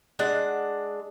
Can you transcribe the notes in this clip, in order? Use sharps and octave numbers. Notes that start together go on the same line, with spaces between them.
G#3 D4 F#5